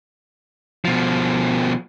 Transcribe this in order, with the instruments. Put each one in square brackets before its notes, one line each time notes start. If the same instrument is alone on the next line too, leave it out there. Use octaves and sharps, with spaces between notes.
[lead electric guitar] B2 F3